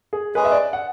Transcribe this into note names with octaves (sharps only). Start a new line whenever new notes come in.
G#4
G#3 C#4 G#4 B4
E5
D5
F#5